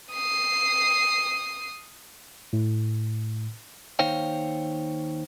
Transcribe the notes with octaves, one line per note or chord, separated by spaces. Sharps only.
D#6 C7
A2
D#2 D#4 C5 C#5 F5 G5